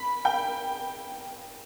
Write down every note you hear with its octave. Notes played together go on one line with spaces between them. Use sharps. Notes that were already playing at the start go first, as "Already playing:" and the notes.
Already playing: B5
G5